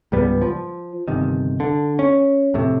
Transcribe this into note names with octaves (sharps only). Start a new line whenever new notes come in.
C#2 G#2 G3 B3
F3
G1 C3 D#3
D3
C#4
F2 A2 C3